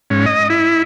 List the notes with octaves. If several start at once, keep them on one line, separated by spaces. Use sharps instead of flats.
G#2 C#4
D#5
E4